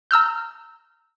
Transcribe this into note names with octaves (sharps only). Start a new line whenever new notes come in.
A#5 E6 F6 G6